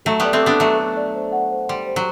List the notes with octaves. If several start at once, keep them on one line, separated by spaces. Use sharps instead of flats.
F#3 A3 A4
G3 B3 D5
A3 C4
B3 D4 D6
F#3 A3 A5
A4
D5
C5
F#5
C5
G3 C6
C5
F#3